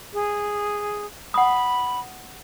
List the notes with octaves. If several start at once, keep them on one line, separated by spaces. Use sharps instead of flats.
G#4
F#5 B5 D#6